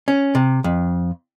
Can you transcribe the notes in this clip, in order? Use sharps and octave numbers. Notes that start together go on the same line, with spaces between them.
C#4
C3
F2